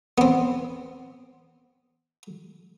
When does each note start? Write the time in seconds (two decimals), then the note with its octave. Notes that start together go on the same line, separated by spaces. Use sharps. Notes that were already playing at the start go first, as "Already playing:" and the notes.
0.18 B3 C4